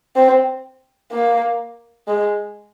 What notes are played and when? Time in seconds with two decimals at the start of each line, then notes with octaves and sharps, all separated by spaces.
0.16 C4
1.12 A#3
2.07 G#3